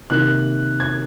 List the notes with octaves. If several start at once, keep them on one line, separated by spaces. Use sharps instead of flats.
C3 D#3 A#3 F#6
G#6